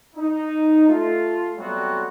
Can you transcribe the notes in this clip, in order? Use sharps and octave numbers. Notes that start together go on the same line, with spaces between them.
D#4
A3 F4
F#3 G3 A3 B3 C4 F#4